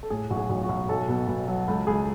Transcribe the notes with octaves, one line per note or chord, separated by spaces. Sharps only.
A4
A2 G#4
B1 F#4
G#4
B1
F#4
B1
B1 A4
B2
B2
F#3
C#2 A4
C#2 G#4